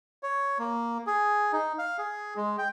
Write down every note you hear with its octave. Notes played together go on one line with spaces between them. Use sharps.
C#5
A#3
G#4
D#4
F5
G#4
G#3
G5